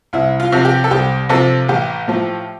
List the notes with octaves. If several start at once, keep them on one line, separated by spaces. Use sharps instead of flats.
C2 E4
F4
C3 F3
G4
A4
C2 G4
C3 F3 A4
A1 G4
A2 F3